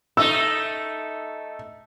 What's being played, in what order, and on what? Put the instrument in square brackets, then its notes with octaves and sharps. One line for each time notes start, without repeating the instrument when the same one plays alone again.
[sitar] A3 D#4 [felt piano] E6